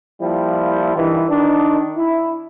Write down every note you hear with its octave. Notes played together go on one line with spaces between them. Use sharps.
F3 G3 A#3 E4
G2 D#3 E3
D#3 D4
E4